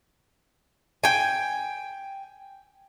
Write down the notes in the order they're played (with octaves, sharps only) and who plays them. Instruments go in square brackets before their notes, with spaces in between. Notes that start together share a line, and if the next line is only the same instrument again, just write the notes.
[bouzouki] G5 G#5